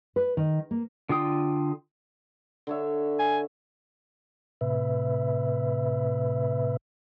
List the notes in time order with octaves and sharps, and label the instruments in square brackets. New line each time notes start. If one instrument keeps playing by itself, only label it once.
[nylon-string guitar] B4
D#3
A#3
[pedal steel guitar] D3 F4 G5 D#6
[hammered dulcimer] D3 C#5 E5
[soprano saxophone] G#5
[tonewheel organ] A2 C3 B4 E5